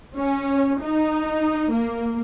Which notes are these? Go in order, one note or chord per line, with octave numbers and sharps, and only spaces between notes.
C#4
D#4
A#3